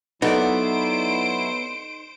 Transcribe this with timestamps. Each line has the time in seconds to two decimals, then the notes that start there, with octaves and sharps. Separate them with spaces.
0.22 F#3 B3 D#4 E4 A4 C5 D5 D7